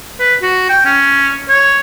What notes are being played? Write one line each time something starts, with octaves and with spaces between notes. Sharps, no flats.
B4
F#4
G5
C#4
C#5